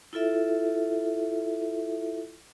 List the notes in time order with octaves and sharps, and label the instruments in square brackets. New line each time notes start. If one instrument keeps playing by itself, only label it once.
[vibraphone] E4 F4 A4 E5